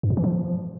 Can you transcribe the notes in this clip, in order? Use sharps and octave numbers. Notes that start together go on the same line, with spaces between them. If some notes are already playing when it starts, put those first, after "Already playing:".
G2
A#2
E3
F3